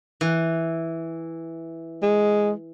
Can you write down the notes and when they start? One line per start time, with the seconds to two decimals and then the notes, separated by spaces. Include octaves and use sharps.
0.21 E3
2.03 G#3